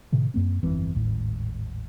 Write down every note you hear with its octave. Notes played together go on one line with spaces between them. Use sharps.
A2 C3 D#3
F#2 A#3 C4
G1 F2 E3 C4
D#1 G#1 A2